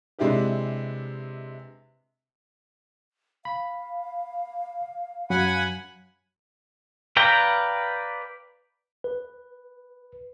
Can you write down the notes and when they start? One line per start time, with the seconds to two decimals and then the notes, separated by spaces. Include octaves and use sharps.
0.19 C3 G#3 D4 E4 G4 B4
3.45 F5 B5
5.30 F#2 F#3 F#5 G#5 B5
7.17 B4 D5 F5 G5 A#5
9.04 B4